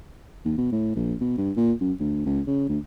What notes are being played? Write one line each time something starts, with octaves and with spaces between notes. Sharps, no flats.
D#2
B2
A2
A#1
B2
G2
A#2
F#2
D2
C#2
C#3
D2